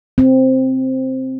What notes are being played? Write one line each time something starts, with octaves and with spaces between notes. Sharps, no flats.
C4